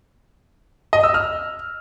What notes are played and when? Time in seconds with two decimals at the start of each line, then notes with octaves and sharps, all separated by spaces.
0.93 D#5
1.04 E6
1.14 F6